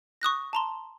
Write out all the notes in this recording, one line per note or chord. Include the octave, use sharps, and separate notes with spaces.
C#6 D#6 F#6 A#6
A5 A#5 C6